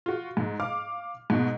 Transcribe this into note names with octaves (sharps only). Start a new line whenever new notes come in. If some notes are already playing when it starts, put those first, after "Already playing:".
F4 F#4
G#2
F5 D6 F6
G#2 B2